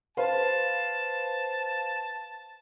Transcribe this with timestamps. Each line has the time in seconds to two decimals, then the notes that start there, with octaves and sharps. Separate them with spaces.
0.17 B4 C5 F5 A5